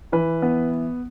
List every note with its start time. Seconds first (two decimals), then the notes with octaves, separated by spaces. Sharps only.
0.12 E3 B4
0.42 B3